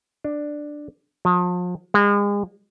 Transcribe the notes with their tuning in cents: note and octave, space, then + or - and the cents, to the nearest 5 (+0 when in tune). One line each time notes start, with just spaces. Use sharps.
D4 +10
F3 +40
G#3 -35